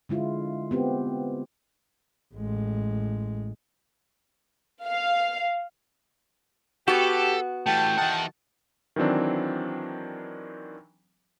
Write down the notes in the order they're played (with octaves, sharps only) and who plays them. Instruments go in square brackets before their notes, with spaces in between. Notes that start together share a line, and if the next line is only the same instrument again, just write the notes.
[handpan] D3 G#3 E4 F4
B3 C4 G4
[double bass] A1 G#3
[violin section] F5
[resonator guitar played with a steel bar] B3 F#4 [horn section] G4 [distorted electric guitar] A4
[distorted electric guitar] E3 A3 [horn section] G3 G4 A5 [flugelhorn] G5
[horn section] D#3 A5 [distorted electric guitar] E3 F#5
[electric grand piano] D#3 E3 F#3 C4 D4